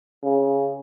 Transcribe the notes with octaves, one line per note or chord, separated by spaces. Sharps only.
C#3